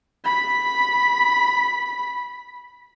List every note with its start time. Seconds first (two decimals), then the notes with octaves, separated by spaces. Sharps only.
0.25 B5 B6